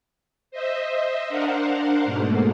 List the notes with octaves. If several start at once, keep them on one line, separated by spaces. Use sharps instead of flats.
C5 D#5 E5
D4 A#4 C5 F5 F#5
G#2 B2 A3 A#3